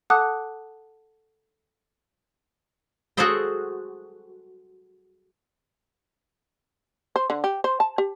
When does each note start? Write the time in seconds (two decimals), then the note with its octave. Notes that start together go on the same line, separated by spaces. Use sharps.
0.10 A4 F#5 A5 D6 D#6 F#6
3.17 F#4 G#4 A4 C5 D#5 G5
7.16 C5
7.30 D3
7.44 G4
7.64 C5
7.80 A5
7.98 G4